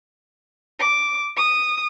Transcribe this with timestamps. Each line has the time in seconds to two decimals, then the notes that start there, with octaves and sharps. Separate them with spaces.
0.79 D6
1.36 D#6